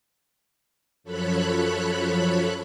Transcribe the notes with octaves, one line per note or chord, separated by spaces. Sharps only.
F#2 F3 A4 C#5 B5 F#6